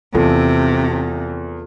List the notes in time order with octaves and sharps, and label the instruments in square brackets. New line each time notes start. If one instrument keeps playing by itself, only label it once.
[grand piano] E2 [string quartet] C3 [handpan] F4 A4